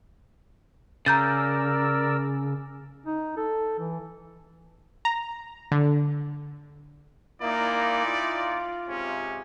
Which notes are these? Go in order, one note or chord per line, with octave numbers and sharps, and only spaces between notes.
C#3 A#4 D5 A#5 E6 G6 A6
D#4
A4
E3
A#5
D3
A#2 A#3 D#4 E4 D5
F4
G#2 C3 C#4